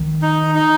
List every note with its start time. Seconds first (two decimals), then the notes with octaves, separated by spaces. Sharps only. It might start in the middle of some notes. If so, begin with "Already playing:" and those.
Already playing: D#3
0.22 D#4
0.55 D#4